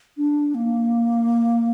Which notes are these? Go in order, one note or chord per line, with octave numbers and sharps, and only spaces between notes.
D4
A#3